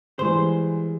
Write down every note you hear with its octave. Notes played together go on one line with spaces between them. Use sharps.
E3 G3 G#3 C5